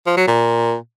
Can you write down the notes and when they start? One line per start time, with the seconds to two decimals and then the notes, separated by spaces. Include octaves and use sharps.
0.06 F3
0.17 F#3
0.27 A#2